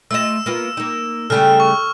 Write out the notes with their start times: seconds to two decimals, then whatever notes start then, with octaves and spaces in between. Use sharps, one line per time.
0.11 A3 F4 D#5 E6 E7
0.46 A#3 B3 F4
0.77 A#3 D#4
1.30 C#3 G3 A3 A4 F6
1.60 C#6